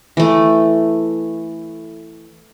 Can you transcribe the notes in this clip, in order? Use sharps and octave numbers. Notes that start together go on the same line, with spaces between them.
E3 A3